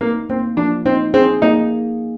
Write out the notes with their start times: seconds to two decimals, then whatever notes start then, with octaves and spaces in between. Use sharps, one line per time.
0.01 A#3 D#4
0.30 A#3 C4
0.57 F3 D4
0.86 C4 D#4
1.14 C4 G#4
1.42 A#3 D#4